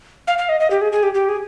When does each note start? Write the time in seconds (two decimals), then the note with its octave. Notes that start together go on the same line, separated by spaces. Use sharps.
0.27 F5
0.38 F5
0.49 D#5
0.60 D#5
0.71 G4
0.81 G#4
0.92 G#4
1.03 G4
1.14 G4
1.29 G#4